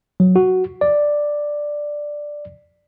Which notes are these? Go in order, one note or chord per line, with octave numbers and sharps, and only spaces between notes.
F#3
F#4
D5